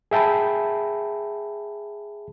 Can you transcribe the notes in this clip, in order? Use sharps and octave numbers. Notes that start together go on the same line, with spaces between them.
G#4 E5 G5 A5 B5